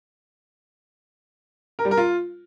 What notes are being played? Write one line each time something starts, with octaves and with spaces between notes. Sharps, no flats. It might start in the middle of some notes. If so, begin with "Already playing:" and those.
A#4
G3
A#4
F4